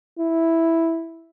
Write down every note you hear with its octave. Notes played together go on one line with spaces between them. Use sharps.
E4